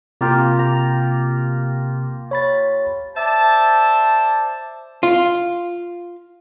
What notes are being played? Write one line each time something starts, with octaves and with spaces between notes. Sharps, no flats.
C3 A#3 F4 G4
A#5
C#5 B5 A6
C5 D5 E5 A5
F4